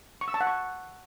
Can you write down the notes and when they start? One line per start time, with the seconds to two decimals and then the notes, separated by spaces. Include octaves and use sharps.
0.21 C#6
0.28 E6
0.34 A5
0.41 F#5
0.47 C#6